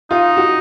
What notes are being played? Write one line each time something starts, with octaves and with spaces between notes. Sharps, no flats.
D#4 F4
F#4